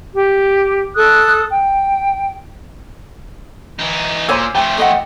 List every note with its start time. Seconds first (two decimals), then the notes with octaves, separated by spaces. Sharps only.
0.15 G4
0.95 A4 D#6 F#6
1.50 G5
3.79 E3 D#4
4.29 A#2 C5 C#5 G#5 C6 D6 E6
4.55 F3 A3 G5
4.78 A4 D#5 F#5